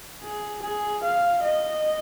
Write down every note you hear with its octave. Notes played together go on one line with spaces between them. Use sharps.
G#4
G#4
F5
D#5